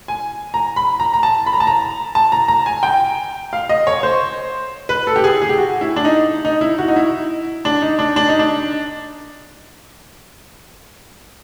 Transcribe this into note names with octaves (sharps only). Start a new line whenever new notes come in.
G#5
A#5
B5
A#5
A#5
A5
B5
A#5
A5
A#5
A5
A#5
A#5
G#5
G5
F5
D#5
C#5
C5
B4
A4
G4
G#4
G#4
G4
F#4
E4
D4
D#4
D#4
E4
F#4
D#4
E4
D4
D#4
D4
D4
D#4
D4